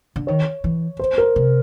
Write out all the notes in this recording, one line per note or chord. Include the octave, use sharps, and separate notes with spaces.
D3
D#3 C#5
E3
C5
A#4
C3